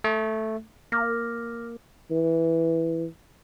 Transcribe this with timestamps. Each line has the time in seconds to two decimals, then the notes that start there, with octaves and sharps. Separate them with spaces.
0.04 A3
0.92 A#3 D6 F6 A#6
2.11 E3